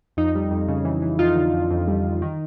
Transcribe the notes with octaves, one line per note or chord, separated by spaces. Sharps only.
F2 D#4
G3
F2
C#3
E3
E3
F2 D#4 F4
D3
F2
F2
G3
F2
D#3